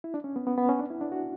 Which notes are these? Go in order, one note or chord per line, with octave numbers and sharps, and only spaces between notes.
E4
D4
C#4
B3
B3
B3
C#4
D4
E4
D4
F#4